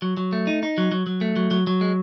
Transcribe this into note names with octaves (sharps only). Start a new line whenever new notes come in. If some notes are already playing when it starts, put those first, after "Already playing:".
F#3
F#3
A3
D#4
D#4
F#3
F#3
F#3
A3
F#3
F#3
F#3
G#3